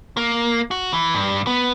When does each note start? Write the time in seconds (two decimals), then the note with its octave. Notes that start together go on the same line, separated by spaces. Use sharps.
0.17 A#3
0.71 F#4
0.93 E3
1.14 G2
1.47 B3